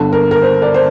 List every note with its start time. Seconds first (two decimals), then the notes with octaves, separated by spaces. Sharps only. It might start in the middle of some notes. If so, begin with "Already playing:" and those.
Already playing: G1 G2 D3
0.13 A#4
0.31 A#4
0.42 C5
0.62 A#4 D5
0.74 C5